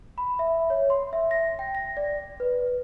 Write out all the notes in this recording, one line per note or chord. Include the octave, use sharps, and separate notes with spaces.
B5
E5
C#5
C6
E5
A#6
G5
A#6
D5
B4